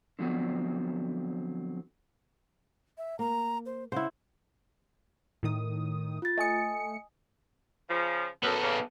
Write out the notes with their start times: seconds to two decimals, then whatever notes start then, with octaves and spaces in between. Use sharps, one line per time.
0.19 D3 F3 F#3 B3 C4
2.98 E5
3.19 A#3 A#5
3.66 C5
3.92 C#3 E4 C5 F#5
5.43 A2 D#3 D#6
6.22 F4 A6
6.38 A3 D#5 G#5 D#6 C#7
7.90 C#3 F3
8.43 F#2 B3 A4
8.62 C#3 A#3